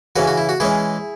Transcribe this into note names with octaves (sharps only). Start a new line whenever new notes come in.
C#3 E3 C#4 F#4 B4
F#4
E4
F#4
E3 G#3 C#4 E4 G#4